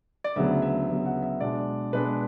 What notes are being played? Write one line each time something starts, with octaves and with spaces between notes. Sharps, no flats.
D5
D2 C#3 F#3 B3 E5
E5
D2 C#3 F#3 B3
F#5
E5
B2 G#3 D4 D5
B2 G#3 D4 B4